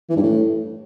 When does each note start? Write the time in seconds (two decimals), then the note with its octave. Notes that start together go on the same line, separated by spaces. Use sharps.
0.10 E3
0.16 G2
0.23 A2